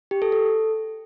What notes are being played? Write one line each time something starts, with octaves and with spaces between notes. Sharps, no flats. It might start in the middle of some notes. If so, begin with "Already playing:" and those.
G4
A4
A4